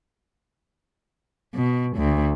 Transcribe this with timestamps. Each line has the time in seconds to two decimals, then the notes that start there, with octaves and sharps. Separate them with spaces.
1.55 B2
1.97 D2